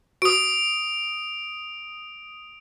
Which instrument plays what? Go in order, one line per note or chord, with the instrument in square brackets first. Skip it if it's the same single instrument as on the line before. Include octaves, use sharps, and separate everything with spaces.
[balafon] F#4 [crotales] D#6 D7